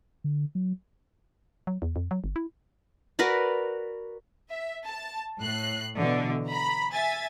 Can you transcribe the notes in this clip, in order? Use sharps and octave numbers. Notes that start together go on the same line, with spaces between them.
D3
F#3
F#3
E2
F2
F#3
G1
E4
F#4 A#4 B4 D5
E5
A5
A2 F#6 C7
B2 D3 E3
A#5 B5
E5 G#5 A6